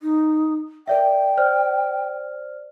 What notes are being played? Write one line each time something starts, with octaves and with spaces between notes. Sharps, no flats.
D#4
A#4 D5 E5 G5
C5 D5 F6